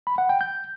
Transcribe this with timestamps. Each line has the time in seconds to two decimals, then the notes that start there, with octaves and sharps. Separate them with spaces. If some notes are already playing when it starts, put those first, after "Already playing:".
0.07 B5
0.18 F#5
0.29 G5
0.41 G6